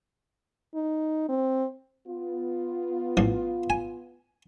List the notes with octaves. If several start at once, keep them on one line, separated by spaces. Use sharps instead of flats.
D#4
C4
B3 F4
A1 F3
G#5